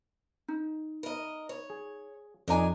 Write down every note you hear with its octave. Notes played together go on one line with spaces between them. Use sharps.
D#4
A#4 D#5
C#5
G#4
F2 D4 D#4 D#5 G#5 A#5